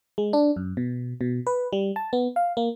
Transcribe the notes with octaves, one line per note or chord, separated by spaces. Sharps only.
G#3
D4
F#2
B2
B2
B4
G3
A5
B3
F5
A#3